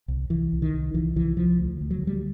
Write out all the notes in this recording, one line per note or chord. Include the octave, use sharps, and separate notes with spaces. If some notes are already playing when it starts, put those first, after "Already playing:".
C2
C2 E3
C2
D#3
C2
C2 E3
C2 E3
C2 F3
D2
D2
F#3
D2
G3